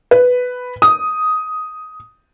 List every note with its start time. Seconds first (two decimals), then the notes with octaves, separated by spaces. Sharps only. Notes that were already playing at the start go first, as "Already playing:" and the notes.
0.11 B4
0.82 D#6